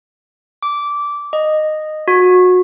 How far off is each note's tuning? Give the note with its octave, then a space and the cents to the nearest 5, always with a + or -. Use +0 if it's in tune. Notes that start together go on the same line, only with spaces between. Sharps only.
D6 -15
D#5 -10
F#4 -25